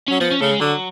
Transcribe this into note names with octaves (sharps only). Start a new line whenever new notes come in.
F#3 C#4
F3 B3
C#4
C#3 A3
G#3
D3 F#3